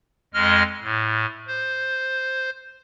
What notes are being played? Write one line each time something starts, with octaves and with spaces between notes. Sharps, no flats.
F2 G#3 D#5 F6
A2
C5